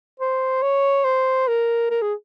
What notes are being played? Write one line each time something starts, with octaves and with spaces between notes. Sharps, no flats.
C5
C#5
C5
A#4
A#4
G#4